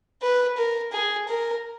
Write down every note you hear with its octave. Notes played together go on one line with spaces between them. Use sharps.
B4
A#4
G#4
A#4